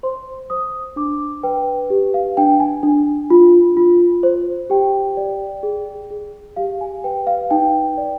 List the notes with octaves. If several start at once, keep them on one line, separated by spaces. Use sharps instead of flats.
C5 C6
C5 D#6
D4 D6
B4 G5
G4
F5
D4 G5
G#5
D4
F4
F4
C5
G4 G5
D5
G#4
G#4
G4 F5
G#5
B4 G5
F5
D#4 G5
D5